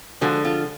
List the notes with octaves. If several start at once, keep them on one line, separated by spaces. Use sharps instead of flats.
D3 F3 G#3 F#4
F4